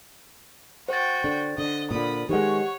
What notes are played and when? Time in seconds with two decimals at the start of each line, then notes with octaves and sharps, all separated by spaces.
0.88 F#4 C5 G5 A6
1.24 D3
1.58 D3 D#5
1.91 A#2 D3 B5 D#6
2.29 D#3 G#3 G4 C5 C#5 F#5